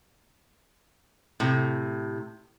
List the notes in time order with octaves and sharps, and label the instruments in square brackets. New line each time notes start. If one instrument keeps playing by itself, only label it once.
[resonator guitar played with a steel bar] A2 C3